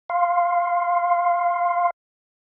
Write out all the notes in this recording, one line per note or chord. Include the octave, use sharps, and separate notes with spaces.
F5 C6